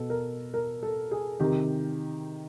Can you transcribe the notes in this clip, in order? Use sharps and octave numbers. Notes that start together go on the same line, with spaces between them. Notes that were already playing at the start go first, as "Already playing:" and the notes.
Already playing: B2 A4
A#4
A#4
A4
G#4
C3 D#3 G4